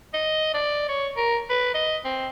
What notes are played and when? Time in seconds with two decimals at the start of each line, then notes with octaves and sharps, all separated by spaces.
0.14 D#5
0.54 D5
0.89 C#5
1.17 A#4
1.50 B4
1.74 D#5
2.05 C4